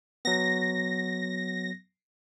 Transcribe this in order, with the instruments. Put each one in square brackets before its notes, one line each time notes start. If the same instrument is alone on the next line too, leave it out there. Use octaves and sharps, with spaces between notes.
[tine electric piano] F#3 B3 [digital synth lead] A#6